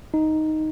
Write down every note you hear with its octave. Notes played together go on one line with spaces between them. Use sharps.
D#4